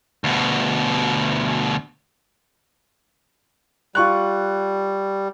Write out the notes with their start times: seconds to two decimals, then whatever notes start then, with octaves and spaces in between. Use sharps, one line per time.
0.24 D2 B2
3.95 G3 F4 C#6 F#6